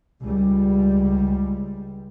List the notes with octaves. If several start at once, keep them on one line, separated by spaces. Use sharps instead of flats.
C#2 G3